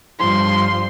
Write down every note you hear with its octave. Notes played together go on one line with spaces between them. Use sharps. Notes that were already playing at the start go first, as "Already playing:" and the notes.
G2 F3 C6